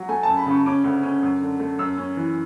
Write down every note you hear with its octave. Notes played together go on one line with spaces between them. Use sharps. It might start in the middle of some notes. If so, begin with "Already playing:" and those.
Already playing: F#3
A3 G#5
F#2 A5
B5
C#3 C#6
C#4 D6
D2
C#4
F#2
D3
A3
F#2 E6
C#4
E3